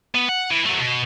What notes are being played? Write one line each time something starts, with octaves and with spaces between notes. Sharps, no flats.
B3
F#5
E3
F#3 A3
B2